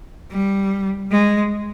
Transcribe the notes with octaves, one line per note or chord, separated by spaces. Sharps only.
G3
G#3